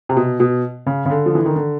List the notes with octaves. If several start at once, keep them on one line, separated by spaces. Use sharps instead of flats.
C3
B2
B2
C#3
C#3
D3
F3
E3
D#3
D3